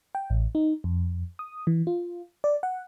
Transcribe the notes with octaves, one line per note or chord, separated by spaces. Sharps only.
G5
A1
D#4
F2
D#6
E3
F4
D5
F#5